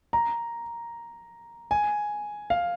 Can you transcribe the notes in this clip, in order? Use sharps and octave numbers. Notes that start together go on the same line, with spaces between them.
A#5
G#5
F5